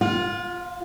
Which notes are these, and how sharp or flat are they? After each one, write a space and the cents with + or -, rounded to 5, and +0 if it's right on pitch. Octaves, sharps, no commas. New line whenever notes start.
F4 +0 F5 +45